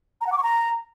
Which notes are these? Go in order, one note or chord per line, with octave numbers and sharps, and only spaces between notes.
A#5
F#5
D6
C#6
A#5